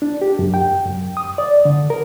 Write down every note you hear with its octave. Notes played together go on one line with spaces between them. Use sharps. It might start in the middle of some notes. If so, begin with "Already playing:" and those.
D4
G4
F#2
G5
F#2
D#6
D5
D3
A#4